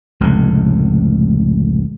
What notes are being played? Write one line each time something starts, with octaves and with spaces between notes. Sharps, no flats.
F1 C#2 A2